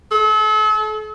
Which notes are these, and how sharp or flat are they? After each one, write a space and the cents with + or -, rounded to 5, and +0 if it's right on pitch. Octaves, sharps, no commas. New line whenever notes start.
A4 -40